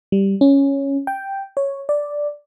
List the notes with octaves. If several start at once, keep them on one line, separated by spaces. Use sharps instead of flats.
G3
C#4
G5
C#5
D5